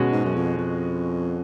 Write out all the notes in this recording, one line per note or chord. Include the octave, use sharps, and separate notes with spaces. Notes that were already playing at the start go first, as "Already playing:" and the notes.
Already playing: B2 G#3 C#4 F#4
G#2
F#2
F2
F2